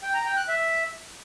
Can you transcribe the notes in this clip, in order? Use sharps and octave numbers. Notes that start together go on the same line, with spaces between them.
G5
A#5
G5
F#6
E5